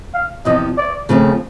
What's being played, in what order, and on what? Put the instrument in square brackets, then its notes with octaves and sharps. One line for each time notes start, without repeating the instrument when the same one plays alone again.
[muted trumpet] F5
[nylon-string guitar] E2 C3 F3 [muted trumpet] D#5
[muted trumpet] D5
[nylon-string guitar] D#2 C#3 F3 A3 C4